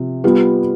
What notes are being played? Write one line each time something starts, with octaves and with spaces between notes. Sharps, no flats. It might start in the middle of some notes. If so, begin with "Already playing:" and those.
Already playing: C3 F3
G3 B3 F4